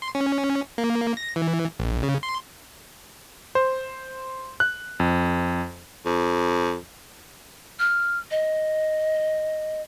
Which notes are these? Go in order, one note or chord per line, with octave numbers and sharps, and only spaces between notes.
C6
C#4
A#3
A#6
E3
A#1
C#3
C6
C5
F#6
F2
F2
F6
D#5